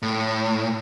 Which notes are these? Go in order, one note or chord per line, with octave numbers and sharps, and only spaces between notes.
A2